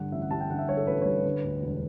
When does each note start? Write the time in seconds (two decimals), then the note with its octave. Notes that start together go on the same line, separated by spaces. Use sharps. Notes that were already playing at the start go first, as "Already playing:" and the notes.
Already playing: G2 D3 F#5
0.12 A1 E5
0.22 F#5
0.31 G3 A5
0.41 G5
0.50 D3 F#5
0.59 E5
0.68 G2 C#5
0.77 A4
0.87 A1 B4
1.02 C#5
1.05 G3 B4
1.25 D3 B4
1.44 D2
1.62 E1